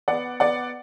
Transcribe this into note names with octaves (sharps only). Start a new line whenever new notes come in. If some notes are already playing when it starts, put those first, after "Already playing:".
B3 D5 F#5
B3 D5 F#5